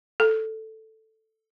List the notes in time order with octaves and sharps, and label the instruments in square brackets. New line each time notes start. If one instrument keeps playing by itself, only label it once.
[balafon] A4